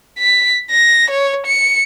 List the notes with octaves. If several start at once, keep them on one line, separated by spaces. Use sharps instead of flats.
B6
A#6
C#5
C#7